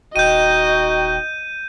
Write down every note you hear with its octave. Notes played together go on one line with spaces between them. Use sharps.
D#1 D#4 F#4 D#5 G5 G6 D#7